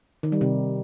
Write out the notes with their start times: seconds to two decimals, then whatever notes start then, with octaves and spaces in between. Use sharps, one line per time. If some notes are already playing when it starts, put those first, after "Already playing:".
0.23 D#3
0.32 G3
0.41 C3